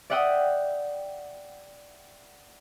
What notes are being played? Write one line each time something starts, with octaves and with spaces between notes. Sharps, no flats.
D5 E5 F#5 G5 D#6